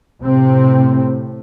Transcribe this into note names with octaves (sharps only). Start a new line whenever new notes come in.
A2 C3 C4